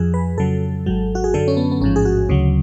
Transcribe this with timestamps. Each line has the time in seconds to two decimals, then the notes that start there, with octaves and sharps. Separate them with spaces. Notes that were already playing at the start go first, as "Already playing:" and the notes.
Already playing: F2 F3 G#4
0.14 B4
0.38 F2 C#3 F#3 A4
0.86 G#1 G#2 F#3
1.15 F#4
1.24 G#4
1.34 F#2 D3 F#3 A4
1.48 C#4
1.57 B3
1.71 B3
1.81 A1 G#2 F3 C#4
1.96 G#4
2.05 F#4
2.29 D2 C#3 F#3